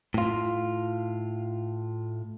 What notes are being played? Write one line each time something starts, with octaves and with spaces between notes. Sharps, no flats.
A2 F4